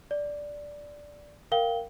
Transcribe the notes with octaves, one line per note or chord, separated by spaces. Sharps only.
D5
A#4 F5 G5 G7